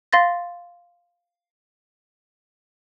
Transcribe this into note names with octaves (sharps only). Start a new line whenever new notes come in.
F5 C6 A6 A#6